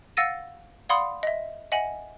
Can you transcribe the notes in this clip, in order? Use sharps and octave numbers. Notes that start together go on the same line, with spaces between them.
F5 F#5 E6 A6 A#6 D#7
D5 F5 F#5 B5 C6 D#6
D#5 E5
D#5 E5 F#5 G#5 F#7